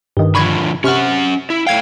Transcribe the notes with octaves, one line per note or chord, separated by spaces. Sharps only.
G2 D#3
D3 F3 B5 C#6 G#6
C3 C#4 F#5 C#6 F6
E4
A3 F5 G5 G#6